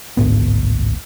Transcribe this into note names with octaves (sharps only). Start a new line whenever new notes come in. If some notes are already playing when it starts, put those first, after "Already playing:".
A1 D2 G#2 B3